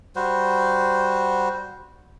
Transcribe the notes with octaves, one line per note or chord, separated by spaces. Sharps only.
G3 F#4 C5